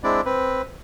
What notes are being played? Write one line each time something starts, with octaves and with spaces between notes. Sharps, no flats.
G#3 C4 D4 E4 D5
C4 B4